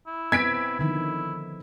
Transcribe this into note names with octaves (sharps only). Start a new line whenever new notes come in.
E4
B3 C4 G#6 B6 D7
D3 D#3 F3 E4